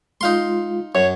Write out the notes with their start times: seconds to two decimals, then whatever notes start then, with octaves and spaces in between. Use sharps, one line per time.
0.21 G#3 D#4 F4 F5 C6
0.95 F#2 C#5